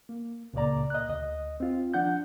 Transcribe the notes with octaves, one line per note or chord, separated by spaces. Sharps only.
A#3
C#2 A#2 C#3 A#3 D5 A#5
D#5 F#6
D2 D#5
C4 F4
F3 D4 F#5 G6